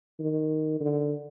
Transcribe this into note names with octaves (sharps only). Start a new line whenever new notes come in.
D#3
D3